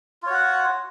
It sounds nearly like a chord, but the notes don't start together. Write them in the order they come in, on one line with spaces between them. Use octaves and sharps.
F4 C#5 F#4 F#5